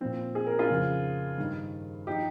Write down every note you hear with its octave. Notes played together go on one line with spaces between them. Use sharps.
A#2 F3 C4
G#4
A#4
F4 G#4
F2 C#3 F3
G2 D#3
F3 D#4 G4